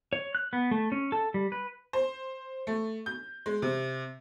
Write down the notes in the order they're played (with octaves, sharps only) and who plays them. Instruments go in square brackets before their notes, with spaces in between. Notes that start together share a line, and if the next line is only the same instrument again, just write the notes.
[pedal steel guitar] C#5
F#6
B3
A3
C#4
A4
G3
B4
[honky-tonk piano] C5
A3
G6
G#3
C3